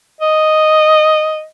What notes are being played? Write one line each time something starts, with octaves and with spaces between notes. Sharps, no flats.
D#5